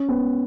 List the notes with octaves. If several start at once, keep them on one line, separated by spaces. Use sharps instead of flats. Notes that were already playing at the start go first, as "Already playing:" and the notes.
Already playing: C#4
B3